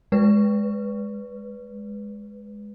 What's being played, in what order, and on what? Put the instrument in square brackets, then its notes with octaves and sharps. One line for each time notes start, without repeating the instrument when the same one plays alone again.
[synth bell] G#3 B4